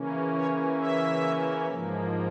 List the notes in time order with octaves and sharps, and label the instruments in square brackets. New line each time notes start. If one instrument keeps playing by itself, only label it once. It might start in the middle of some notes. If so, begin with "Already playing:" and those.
Already playing: [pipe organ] C#3 E3 A#3 C#4
C#5
E5
G#2 F3 A#3